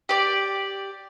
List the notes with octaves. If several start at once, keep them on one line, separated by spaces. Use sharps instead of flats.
G4 D5